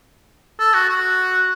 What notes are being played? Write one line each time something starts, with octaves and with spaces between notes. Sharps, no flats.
A4
F#4
F#4